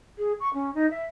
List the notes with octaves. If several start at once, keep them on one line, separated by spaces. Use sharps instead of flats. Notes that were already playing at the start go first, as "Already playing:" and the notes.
G#4
C#6
C#4
D#4
E5